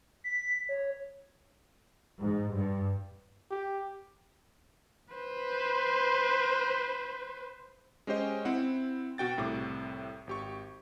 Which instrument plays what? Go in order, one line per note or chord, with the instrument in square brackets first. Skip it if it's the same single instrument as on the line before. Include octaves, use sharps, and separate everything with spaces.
[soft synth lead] B6
C#5
[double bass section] G#2
G2
[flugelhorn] G4
[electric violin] B4 C5
[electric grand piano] G#3 C#4 G4 C5 D#5
C4 E4 F#5
B2 F#4 G5 A6
C2 A2 C3 D6
G#1 G4 C#6